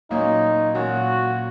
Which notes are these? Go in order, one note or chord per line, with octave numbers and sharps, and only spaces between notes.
A#2 F#3 A#3 C#4 D#4
A#2 F#3 A#3 C#4 F#4